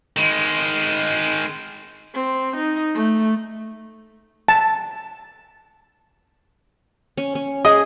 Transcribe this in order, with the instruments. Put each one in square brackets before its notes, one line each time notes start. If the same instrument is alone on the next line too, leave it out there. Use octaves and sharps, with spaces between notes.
[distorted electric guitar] D#3 G#3
[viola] C4
D#4
A3
[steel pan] A5
[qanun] C#4
C#4
[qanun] G#4 [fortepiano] D#5